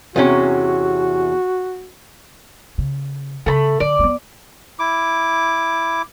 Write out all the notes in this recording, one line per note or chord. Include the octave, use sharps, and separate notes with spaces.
E2 C3 C#4 F#4
C#3
C#3 A3 A5 B5
D3 D5
A#3 B3
E4 D6